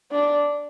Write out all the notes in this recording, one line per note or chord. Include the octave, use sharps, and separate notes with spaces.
D4